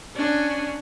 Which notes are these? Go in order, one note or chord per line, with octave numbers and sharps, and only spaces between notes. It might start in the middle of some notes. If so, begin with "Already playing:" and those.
C#4 D4